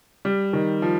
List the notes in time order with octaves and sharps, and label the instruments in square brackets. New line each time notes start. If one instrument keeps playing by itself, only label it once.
[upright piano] G3
D#3
F3